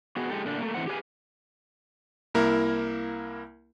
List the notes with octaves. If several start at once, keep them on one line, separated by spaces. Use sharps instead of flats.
B3 F#4 G#4
G#3 G4 A4
A#2 D3 A3 D4
A3 A#3
A2 E3 B3 C4 F#5
G4 G#4 B4 C5 F5 G#5
C2 A#3 E4 A#4